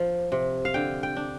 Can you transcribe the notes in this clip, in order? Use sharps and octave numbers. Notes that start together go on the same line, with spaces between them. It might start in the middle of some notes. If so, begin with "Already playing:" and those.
Already playing: F3
C3
F5
D3 G5
G5
D4